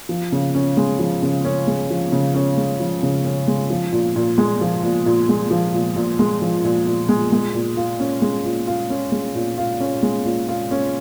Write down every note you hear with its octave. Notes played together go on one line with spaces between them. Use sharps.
F3
C#3
C#4
G#3
F3
C#3
C#4
G#3
F3
C#3
C#4
G#3
F3
C#3
C#4
G#3
F3
A#2
A#2
G#3
F3
A#2
A#2
G#3
F3
A#2
A#2
G#3
F3
A#2
A#2
G#3
G#3
A#2
F4
C#4
G#3
A#2
F4
C#4
G#3
A#2
F4
C#4
G#3
A#2
F4
C#4